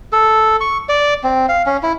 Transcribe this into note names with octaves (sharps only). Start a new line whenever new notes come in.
A4
C#6
D5
C4
F5
C#4
E4